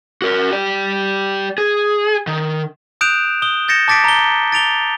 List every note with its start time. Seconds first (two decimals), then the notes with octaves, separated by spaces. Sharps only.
0.22 F#4 A#4
0.52 G4 D5
1.58 G#4
2.27 D#3
3.01 D#6 F#6 G6 D7 E7 F7
3.42 D#6 G7
3.68 G6 A6 A#6 C#7 E7
3.88 A5 D6 A6 B6 D7
4.04 A#5 G7
4.52 A6 D7 F7 G7